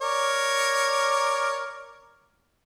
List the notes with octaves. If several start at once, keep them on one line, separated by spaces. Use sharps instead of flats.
A#4 C#5 D5